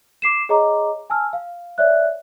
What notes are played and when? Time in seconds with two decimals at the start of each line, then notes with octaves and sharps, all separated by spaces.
0.22 D6 C7 E7
0.49 G#4 C#5 D#5 A#5 D6
1.10 G#5 A5 E6 F6
1.33 F5
1.78 C#5 D5 E5 F#6